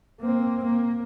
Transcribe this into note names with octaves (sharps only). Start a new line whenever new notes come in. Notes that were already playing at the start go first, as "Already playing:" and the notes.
A#3 C4
A#3